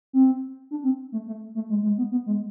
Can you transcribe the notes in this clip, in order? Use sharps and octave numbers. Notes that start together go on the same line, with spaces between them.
C4
D4
C4
A3
A3
A3
G#3
G#3
B3
B3
G#3